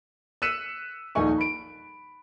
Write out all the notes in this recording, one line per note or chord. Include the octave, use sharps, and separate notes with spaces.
E6 F#6 B6 C#7 D#7 E7
D#1 A#1 D#3 D#4 G#5 C#6
B5 D7